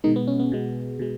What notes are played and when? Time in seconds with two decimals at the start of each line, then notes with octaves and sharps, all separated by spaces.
0.04 B2 D#3 G#3 D#4
0.16 B3
0.27 C#4
0.39 B3
0.52 B2 G#3
0.99 B2 G#3